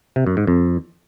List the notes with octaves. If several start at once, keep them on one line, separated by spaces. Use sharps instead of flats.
C3
F#2
G#2
F2